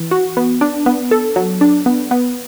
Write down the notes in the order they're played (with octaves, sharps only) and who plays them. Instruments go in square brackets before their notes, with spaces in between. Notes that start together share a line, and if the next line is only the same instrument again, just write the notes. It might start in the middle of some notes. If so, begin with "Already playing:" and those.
Already playing: [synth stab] E3
F#4
B3
D4
B3
A4
F#3
D4
B3
B3